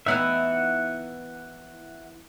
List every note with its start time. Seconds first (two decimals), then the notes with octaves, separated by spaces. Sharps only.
0.06 E3 B3 D#4 E5 F#5